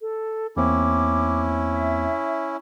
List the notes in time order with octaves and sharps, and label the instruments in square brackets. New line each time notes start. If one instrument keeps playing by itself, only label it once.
[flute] A4
[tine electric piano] E2 A#3 C4 [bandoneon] C#4 E4 [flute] D6
[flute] E5